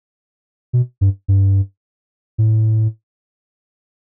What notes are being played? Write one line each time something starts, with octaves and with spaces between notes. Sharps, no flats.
B2
G2
G2
A2